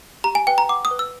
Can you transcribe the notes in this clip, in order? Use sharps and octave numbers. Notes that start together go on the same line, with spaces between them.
G4 A#5
G#5
B4 G5
A#5
F#5 D6
D#6
B4
E6